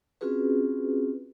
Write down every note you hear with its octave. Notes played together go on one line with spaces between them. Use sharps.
C4 C#4 F4 F#4 G#4 B4